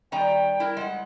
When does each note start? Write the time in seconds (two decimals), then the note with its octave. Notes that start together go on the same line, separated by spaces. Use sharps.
0.12 D#3 G3 B3 G5 A#5
0.60 E4 A#4
0.77 G#3 B4 F#5